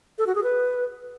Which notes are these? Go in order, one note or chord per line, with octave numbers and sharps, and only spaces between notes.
A4
F#4
G#4
B4